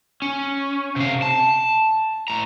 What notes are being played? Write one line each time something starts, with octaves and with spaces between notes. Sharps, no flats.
C#4
C3 F5
A5
A2 A#5